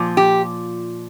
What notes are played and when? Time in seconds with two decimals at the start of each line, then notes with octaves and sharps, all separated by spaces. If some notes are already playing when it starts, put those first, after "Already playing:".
Already playing: A#2 F3
0.17 G4